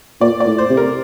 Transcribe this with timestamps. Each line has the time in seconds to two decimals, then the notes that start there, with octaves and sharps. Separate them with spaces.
0.21 A#2 D5
0.40 D5
0.46 A2
0.58 C5
0.70 C3
0.77 A#4